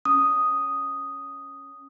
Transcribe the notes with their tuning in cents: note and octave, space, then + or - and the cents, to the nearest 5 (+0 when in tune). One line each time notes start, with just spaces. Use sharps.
C#4 +0 D#6 +0